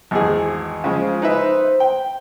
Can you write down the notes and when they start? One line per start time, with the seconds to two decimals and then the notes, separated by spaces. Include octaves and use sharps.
0.11 G#1 E2 G#4
0.84 C#3 F3 G#3
1.22 D#4 B4 C5 E5
1.80 G5